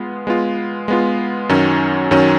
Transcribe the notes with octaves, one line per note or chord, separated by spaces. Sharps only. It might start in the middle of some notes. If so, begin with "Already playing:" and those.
Already playing: G#3 B3 F4
G#3 B3 F4
G#3 B3 F4
F#2 D#3 F#3 C#4
F#2 D#3 F#3 C#4